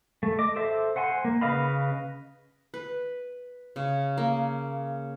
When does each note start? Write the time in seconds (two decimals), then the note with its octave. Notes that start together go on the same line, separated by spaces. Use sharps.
0.23 A3
0.39 D#5 D6
0.56 A4 C5 E5
0.96 C5 F#5 G#5 C6
1.25 A#3
1.41 C#3 B4 D#5 F5 B5
2.74 B4
3.76 C#3
4.17 A#3